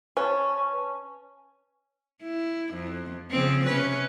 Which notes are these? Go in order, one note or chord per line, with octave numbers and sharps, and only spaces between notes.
C#4 B4 A5
E4
F2
C#3 F3 C4
C3 C#4 B4